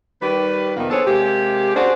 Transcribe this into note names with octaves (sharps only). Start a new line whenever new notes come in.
D#3 G3 G4 B4
F2 C3 D#3 A#3 B3
B3 D4 G#4 A4 C5 C#5
C3 G#3 A#3 G4
C#4 D4 F#4 G#4 C5 D5